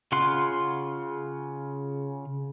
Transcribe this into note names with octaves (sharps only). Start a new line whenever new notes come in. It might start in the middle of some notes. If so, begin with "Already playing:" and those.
C#3 F4 F#5 C6